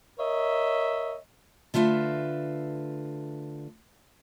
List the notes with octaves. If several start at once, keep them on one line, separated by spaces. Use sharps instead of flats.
A#4 C#5 D#5 E5
D3 A3 F4 B4 E5